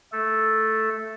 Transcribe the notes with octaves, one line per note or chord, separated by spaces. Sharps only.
A3 A4